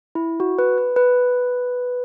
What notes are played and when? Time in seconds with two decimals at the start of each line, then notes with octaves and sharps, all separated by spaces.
0.15 E4
0.40 F#4
0.59 B4
0.78 B4
0.96 B4